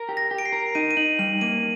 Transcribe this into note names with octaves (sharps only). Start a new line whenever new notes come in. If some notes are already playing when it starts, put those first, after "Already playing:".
Already playing: A#4
G4
A#6
G4
D7
C7
A#4
D#4 D#7
D#7
D#4 F#7
G3 F#7
A#3 D#7